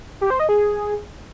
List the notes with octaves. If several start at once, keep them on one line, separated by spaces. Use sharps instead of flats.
G4
C5
D#5
G#4